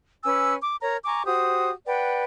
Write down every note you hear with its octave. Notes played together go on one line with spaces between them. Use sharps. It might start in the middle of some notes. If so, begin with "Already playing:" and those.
C#4 B4 G#5 E6
D6
A#4 C#5 A#5
G#5 A#5 C#6 D6
F#4 G4 C5 D#6
B4 D5 F#5 G5